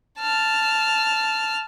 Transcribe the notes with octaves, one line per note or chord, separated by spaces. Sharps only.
A5 F6